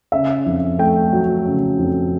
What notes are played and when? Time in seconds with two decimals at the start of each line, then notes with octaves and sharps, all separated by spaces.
0.12 C#3 E5
0.46 F2
0.78 A3 G5
1.13 F#3
1.46 C#3
1.78 F2